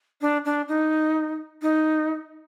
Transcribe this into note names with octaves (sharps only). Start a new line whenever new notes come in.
D4
D4
D#4
D#4